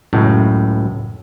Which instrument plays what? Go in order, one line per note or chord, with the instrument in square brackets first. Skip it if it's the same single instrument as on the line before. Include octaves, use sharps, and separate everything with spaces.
[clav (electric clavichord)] C#2 F#2 A2